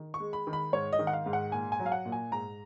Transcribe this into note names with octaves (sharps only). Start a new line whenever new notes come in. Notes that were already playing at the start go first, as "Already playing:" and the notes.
Already playing: D#3
C#6
G#3
B5
D#3
B5
G#2 C#5
D#5
D#3
F#5
F5
G#2
F#5
A#2 G#5
G#5
F#3
F5
F#5
A#2
G#5
G#2 A#5